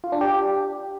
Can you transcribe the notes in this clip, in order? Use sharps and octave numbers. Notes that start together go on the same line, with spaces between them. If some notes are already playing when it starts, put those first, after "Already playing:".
F4
D4
G4